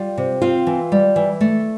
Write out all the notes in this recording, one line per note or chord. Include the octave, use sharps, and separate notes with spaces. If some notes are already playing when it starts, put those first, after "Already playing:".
Already playing: G3 F4 F5
C3
C4 F4 F5
E3
G3
E3
A3